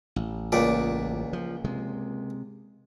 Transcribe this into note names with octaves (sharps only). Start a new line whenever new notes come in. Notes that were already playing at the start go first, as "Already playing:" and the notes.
A1
C#2 A#2 D5
F3
C3 G#3